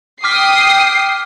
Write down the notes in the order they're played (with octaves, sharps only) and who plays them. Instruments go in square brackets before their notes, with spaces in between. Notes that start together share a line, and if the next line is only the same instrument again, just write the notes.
[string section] G5 D#6 C7 [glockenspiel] D6 F6 B6